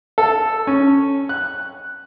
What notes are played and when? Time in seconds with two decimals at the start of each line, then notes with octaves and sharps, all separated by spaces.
0.18 A4
0.67 C#4
1.29 F#6